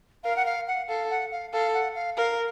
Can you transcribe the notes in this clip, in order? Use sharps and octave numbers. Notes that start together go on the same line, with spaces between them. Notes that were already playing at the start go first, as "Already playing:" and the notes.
A#4 F5
F#5
F5
F#5
A4 F5
F#5
F5
A4 F5
F#5
F5
A#4 F5